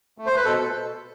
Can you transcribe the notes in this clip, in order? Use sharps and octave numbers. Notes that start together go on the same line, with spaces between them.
A3
C5
B4
B2 A4